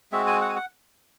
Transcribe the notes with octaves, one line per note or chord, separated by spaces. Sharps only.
G#3 C4 F#4 E5
G#5
F#5
G#5
F#5